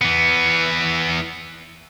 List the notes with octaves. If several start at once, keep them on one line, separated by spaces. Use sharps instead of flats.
E3 B3